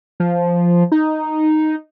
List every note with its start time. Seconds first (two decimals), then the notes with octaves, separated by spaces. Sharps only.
0.20 F3
0.92 D#4